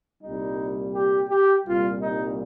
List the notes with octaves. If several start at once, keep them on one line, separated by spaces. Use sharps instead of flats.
C2 A#2 G3 D#4
G4
G4
C2 A#2 G3 F4
D#4